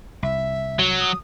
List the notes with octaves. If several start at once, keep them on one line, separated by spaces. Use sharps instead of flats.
C2 E5
F#3
D#6